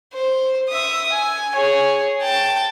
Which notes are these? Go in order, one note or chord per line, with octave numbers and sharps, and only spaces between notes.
C5
E5 D#6
G#5
G#4 C#5
G5 A5